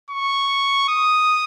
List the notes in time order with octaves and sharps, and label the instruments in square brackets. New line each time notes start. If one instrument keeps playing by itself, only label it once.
[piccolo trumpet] C#6
D#6